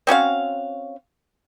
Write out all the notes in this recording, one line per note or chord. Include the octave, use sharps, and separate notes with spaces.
C4 C#4 F#4 F5